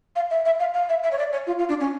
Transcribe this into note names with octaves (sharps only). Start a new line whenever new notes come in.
F5
E5
E5
F5
F5
E5
E5
C#5
D5
C#5
F4
F4
D4
C#4